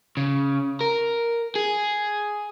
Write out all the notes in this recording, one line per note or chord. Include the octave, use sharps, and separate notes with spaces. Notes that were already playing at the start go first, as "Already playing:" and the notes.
C#3
A#4
G#4